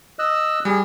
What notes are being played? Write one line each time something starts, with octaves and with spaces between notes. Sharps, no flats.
D#5 E6 F#6
G3 G#4